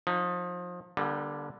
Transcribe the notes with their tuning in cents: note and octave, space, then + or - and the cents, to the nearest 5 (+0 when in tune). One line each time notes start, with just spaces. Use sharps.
F3 +30 D#4 +0
D3 +0 G3 +0 A#3 +45